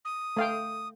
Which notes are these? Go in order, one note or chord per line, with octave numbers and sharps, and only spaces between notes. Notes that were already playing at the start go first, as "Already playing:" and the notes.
D#6
A3 F5 G5